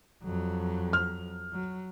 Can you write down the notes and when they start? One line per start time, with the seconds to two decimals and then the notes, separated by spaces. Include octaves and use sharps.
0.24 F2 F#3
0.93 F6
1.52 F#3